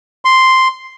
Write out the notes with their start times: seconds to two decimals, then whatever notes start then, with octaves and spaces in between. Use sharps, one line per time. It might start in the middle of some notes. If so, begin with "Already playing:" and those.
0.25 C6